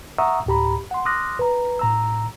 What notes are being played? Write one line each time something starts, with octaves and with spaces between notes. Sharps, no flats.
E5 F#5 A#5 C#6 D#6 E6
D2 A2 G4 A#5 B5
F#5 C6
C6 D6 D#6 F6 F#6 A#6
B4 A#5
A2 A#5 E6